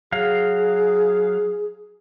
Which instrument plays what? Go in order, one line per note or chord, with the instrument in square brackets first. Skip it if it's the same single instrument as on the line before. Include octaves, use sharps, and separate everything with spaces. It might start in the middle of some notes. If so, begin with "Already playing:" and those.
[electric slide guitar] F#3 F5 [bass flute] G#4